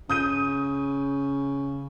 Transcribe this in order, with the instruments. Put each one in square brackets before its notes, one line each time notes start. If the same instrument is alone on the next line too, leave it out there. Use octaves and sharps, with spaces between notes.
[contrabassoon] C#3 [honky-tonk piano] D#6 G6 D#7